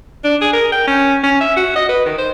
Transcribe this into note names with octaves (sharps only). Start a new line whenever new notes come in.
D4
G#4
A#4
G5
C#4
C#4
E5
F#4
D#5
B4
D#3
C5